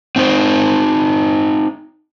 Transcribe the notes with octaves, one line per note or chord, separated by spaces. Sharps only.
C4 D#4 C5